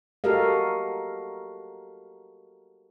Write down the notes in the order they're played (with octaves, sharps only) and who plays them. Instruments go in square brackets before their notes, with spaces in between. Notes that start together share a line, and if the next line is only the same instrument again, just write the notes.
[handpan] F#4 G4 A4 A#4 D#5 F5